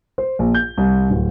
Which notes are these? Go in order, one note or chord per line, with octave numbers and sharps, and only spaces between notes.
C5
A#1
G6
C2
D1